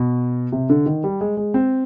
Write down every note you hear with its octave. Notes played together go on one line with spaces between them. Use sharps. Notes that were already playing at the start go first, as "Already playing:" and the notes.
Already playing: B2
C3
D3
D#3
G3
G#3
G#3
C4